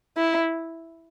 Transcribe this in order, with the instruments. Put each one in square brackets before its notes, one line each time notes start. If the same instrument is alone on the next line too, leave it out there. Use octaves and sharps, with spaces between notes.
[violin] E4